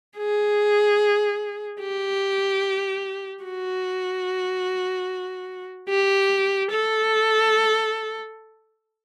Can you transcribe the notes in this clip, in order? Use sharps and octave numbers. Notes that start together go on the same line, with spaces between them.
G#4
G4
F#4
G4
A4